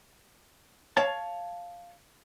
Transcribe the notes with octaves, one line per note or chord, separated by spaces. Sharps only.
C#5 F5 A5